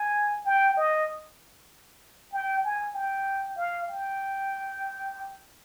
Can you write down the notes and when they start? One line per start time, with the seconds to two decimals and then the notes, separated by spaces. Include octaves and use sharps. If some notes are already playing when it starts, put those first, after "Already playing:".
Already playing: G#5
0.45 G5
0.77 D#5
2.33 G5
2.64 G#5
2.95 G5
3.57 F5
3.88 G5